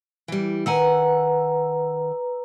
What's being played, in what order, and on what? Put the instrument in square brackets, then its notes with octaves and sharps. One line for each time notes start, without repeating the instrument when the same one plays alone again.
[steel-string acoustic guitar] E3 G3
[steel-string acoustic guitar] D#3 F#5 G#5 [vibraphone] B4 A#5 E6